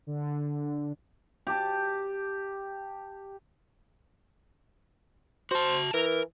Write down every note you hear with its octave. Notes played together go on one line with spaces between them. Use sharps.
D3
G4 A5
F#4 C5 A5
E3 A#4